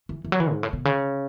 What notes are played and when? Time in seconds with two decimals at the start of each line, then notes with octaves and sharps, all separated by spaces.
0.09 E3
0.25 E3
0.32 F#3
0.40 E3
0.52 G#2
0.63 A2
0.73 B2
0.85 C#3